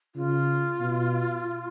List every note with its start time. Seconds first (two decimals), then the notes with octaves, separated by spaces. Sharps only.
0.15 C#3 F4
0.80 B2